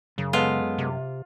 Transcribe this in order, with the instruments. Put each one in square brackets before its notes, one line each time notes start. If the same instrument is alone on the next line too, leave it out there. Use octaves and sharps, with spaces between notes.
[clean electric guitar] F#2 [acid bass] C#3
[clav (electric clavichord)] G#3 B3 A4 [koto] F4
[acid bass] C3